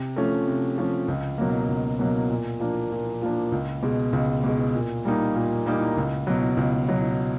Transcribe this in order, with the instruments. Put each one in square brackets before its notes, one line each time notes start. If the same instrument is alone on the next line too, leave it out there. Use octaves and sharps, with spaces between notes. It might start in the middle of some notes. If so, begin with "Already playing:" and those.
Already playing: [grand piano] C3
F3 A3 C#4
C3
F3 A3 C#4
C#2
B2 F#3 A#3
C#2
B2 F#3 A#3
A#2
F3 A#3 D4
A#2
F3 A#3 D4
C#2
B2 G#3
C#2
B2 G#3
A#2
G3 A#3 D#4
A#2
G3 A#3 D#4
C#2
B2 F#3
C#2
B2 F#3